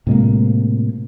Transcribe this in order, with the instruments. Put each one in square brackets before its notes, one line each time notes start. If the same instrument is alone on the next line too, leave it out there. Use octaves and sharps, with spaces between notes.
[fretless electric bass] A2 C3 G#3 A#3